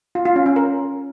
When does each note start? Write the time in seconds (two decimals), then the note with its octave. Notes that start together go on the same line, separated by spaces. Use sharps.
0.15 F4
0.25 F4
0.36 C#4
0.46 C#4
0.56 A#4